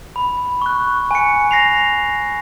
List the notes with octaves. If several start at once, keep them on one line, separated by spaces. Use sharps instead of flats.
B5
C#6 F#6
G#5 C#7
A#6 C7 F7